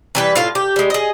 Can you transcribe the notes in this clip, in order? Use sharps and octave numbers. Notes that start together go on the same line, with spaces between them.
E3 G3 B4
A2 F4 F5
G4
G3 G#3
G#4 D#5